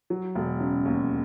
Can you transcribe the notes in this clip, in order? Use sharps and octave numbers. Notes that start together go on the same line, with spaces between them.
F#3
E1
C#3
D#2